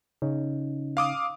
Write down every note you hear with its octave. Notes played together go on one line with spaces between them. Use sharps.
C#3 C#4 D#4
F5 D6 D#6